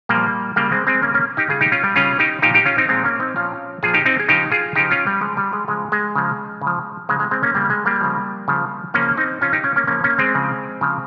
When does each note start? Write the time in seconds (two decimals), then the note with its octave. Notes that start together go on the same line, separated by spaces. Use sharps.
0.09 A#2 F3 G3 A#3
0.56 C#3 G3 A#3
0.72 G#3 C4
0.87 G#3 C4
1.02 C#3 G3 A#3 C#4
1.14 A#3 C#4
1.37 D#4 G4
1.49 C#3 G3 F4 G#4
1.61 D#4 G4
1.72 C#4 F4
1.84 G3
1.96 C#3 G3 C#4 F4
2.19 D#4 G4
2.42 A#2 F3 D#4 G4
2.54 D#4 G4
2.66 C#4 F4
2.78 C4 D#4
2.89 A#2 F3 G#3 C4
3.05 A#3 C#4
3.20 C4 D#4
3.36 A#2 F3 C#4 F4
3.83 A#2 F3 F4 G#4
3.94 D#4 G4
4.06 C4 D#4
4.20 G#4
4.29 C#3 F3 D#4 G4
4.52 F4 G#4
4.75 C#3 F3 D#4 G4
4.91 C#4 F4
5.07 G3
5.21 C#3 F3 G#3
5.37 G3
5.53 G#3
5.68 C#3 F3 G#3
5.92 G#3
6.15 C#3 F3
6.61 C#3
6.67 F3
7.09 C#3 F3 G#3
7.20 G#3
7.31 G#3 C4
7.43 A#3 C#4
7.55 C#3 F3 G3 A#3
7.70 G#3
7.86 G3 A#3
8.01 C#3 F3
8.48 C#3 F3
8.94 C#3 F3 A#3 C#4
9.17 C4 D#4
9.41 C#3 F3 C#4 F4
9.53 D#4 G4
9.64 C#4 F4
9.76 A#3 C#4
9.87 C#3 F3 A#3 C#4
10.04 A#3 C#4
10.18 G#3 C4
10.35 C#3 F3
10.81 C#3 F3